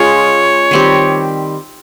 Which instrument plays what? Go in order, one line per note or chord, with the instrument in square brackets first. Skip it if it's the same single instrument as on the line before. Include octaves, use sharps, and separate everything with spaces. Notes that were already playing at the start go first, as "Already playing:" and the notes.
Already playing: [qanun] G#3 C#4 F4 G#4 [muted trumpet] C#5
[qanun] D#3 G3 C4 G4